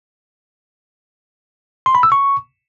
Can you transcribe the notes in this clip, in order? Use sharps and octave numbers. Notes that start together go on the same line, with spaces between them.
C6
B5
E6
C#6